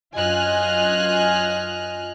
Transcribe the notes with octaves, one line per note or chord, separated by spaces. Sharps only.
F#2 F4 D#5 G#5 F6 F#6